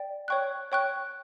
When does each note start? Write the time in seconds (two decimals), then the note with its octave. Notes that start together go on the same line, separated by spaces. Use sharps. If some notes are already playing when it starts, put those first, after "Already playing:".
Already playing: D5 G5
0.28 C#5 G5 C#6 F#6
0.72 C#5 G5 C#6 F#6